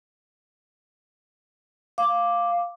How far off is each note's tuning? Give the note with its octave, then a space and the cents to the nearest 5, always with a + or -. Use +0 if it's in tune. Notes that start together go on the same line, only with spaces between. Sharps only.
F5 +0 D6 +0